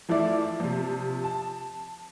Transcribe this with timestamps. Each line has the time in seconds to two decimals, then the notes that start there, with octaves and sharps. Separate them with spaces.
0.09 E3 F3 A3 E4 D5 E5
0.60 C3 F3
1.24 A5